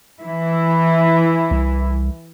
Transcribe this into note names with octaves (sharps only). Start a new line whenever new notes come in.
E3 E4
C2